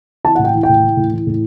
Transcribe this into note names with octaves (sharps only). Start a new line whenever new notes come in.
E3 A5
A2 F#5
G5
E3
G5
A2
E3
A2
E3
A2